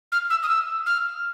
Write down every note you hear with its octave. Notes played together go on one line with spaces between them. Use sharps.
F6
E6
D#6
E6
F6